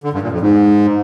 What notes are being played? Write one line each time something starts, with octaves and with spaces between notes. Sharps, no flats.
D3
G2
A#2
F2
G#2